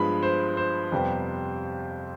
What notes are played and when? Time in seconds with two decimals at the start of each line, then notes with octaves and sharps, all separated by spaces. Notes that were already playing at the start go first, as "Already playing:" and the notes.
Already playing: G2 F3 G#3 B3 B5
0.23 C5
0.57 C5
0.92 F2 C3 G3 B3